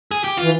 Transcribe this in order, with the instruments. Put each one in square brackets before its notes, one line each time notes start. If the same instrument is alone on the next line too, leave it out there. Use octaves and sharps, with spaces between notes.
[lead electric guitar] G#4
G4
[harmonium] E3 [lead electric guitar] F4